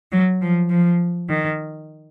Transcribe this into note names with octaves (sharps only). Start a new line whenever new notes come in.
F#3
F3
F3
D#3